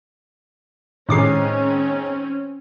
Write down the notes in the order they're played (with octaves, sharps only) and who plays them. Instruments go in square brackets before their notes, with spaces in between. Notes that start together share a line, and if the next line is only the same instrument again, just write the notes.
[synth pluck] A2 D6 C7 [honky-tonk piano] D#3 G#3 [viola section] C4 C#4